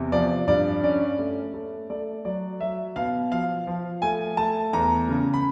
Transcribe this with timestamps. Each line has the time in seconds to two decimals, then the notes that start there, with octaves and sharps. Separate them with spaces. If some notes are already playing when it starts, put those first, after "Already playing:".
Already playing: E2 C3
0.12 F3 D5
0.48 G2 D5
0.83 C#4 D5
1.19 A3
1.54 A3
1.90 A3 D5
2.25 F#3 D5
2.60 F#3 E5
2.96 B2 F5
3.32 F3 F5
3.67 F3
4.02 A3 G#5
4.37 A3 A5
4.73 E2 A#5
5.09 C#3
5.34 B5